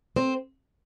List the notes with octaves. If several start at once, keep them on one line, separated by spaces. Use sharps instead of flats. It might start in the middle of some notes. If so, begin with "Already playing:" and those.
C4 C5